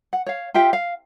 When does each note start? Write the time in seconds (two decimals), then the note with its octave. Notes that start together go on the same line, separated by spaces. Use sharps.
0.13 F#5
0.26 C#5 F5
0.54 F4 G4 E5 G5
0.73 F5